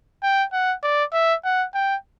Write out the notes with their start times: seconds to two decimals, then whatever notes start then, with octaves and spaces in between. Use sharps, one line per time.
0.23 G5
0.53 F#5
0.83 D5
1.13 E5
1.44 F#5
1.74 G5